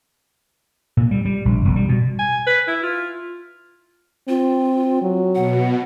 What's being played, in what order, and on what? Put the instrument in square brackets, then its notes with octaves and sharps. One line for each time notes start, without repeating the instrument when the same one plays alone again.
[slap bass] A#2
G3
G3
A#1
E1
G3
B2
[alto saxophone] G#5
B4
E4
F4
[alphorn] C4 [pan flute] F4
[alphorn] F#3
[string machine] B2 [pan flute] F#5